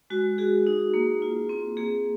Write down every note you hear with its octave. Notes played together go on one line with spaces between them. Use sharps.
G#3 F#4
F#4 G#4
D#4
A#3
F4
C4
A#3 G#4